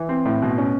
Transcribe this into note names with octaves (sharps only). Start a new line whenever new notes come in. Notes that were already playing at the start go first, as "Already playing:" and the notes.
Already playing: E3
C4
A2
B2
C#4